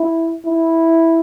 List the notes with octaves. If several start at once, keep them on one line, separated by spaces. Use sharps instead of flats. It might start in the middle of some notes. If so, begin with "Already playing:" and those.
Already playing: E4
E4